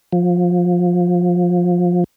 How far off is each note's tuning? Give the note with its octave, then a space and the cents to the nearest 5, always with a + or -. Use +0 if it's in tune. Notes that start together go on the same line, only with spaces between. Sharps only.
F3 +20